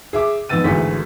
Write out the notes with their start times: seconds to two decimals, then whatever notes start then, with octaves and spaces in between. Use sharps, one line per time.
0.13 G#4 E5 D6
0.49 F2 G#2 B3 E6 A6 D#7
0.64 G#1 D2 E3 A3 G#4 B6